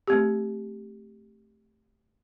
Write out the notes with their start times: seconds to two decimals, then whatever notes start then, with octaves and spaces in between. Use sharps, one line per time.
0.07 A3 C4 G4